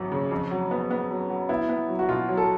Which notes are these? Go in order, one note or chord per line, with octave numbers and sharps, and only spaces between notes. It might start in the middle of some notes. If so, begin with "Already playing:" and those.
Already playing: G#1 F#2 F#3
C#3
F2
F#3
B3
B3
F#3
F#3
B3 E4
B3
F#3
F#4
B2 F4
F#3
A4